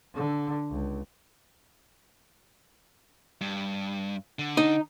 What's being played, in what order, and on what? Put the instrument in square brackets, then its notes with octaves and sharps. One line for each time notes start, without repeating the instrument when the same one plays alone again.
[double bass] D3
C#2
[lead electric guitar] G2
D3
[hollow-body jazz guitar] D#4